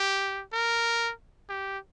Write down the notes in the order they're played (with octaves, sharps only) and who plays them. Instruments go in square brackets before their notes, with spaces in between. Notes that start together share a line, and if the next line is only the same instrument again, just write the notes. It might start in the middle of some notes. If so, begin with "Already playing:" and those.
Already playing: [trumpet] G4
A#4
G4